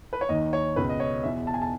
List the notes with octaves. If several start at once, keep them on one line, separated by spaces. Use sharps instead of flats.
B4
C#5
D#2 D#3 D#5
C#5
C#2 B2 B4
D#5
C#5
E2 B2 E5
A5
G#5
A5